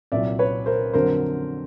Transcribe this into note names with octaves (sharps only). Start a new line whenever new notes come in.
C2 A#2 F#3 D5 E5
B4 C#5
A#4 C5
F2 D3 F#3 A#4 C5